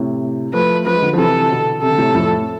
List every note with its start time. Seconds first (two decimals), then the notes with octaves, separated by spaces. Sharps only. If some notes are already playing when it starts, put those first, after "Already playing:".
Already playing: A2 C3
0.53 F3 A3 B4
0.86 F3 B4
0.94 G#3
1.02 D3 F3
1.13 F3
1.18 C3 E3 A4
1.50 B2 D3
1.82 C3 A4
1.91 D3
1.98 A2 C3
2.14 F2 A2